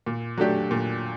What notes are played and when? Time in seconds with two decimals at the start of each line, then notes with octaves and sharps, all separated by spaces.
0.06 A#2
0.37 F#3 A3 D4 G4
0.71 A#2